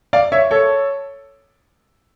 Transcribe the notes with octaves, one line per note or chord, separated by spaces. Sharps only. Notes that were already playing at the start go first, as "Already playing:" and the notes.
D5 F5
C#5 E5
A4 C#5